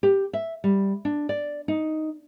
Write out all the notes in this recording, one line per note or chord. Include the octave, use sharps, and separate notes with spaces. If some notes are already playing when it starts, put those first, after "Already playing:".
G4
E5
G3
D4
D5
D#4